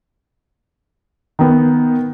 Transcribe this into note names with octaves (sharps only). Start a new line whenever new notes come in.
D#3 B3